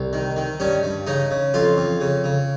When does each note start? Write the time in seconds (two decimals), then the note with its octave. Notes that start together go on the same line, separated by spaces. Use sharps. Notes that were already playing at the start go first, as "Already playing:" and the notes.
Already playing: C2
0.13 D#3
0.36 D#3
0.60 G2 C#4
0.83 G2
1.07 C#3 D#4
1.31 C#3
1.54 F2 F4
1.77 F2
2.00 C#3
2.24 C#3